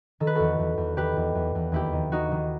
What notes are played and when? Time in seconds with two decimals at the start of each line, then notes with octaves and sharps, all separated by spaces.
0.20 D#3 A4
0.27 B4
0.35 E2 F#4 A4
0.59 E2
0.78 E2
0.97 D#3 G4 B4
1.16 E2
1.35 E2
1.55 E2
1.72 D#2 E4 G4
1.93 D#3
2.12 D#3 D#4 F#4
2.32 D#3